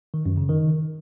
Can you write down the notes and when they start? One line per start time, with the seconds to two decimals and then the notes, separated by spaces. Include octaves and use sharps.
0.14 D#3
0.26 F#2
0.37 C#3
0.49 D#3